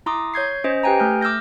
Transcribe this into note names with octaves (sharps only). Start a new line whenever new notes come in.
E4 A#5 C6 D6 D#6
C#5 G6 G#6 C7
C#4 C5 D#5
G4 B4 G5 G#5 A#5
A3 F6 G6
D6 E6 F6 G6 A#6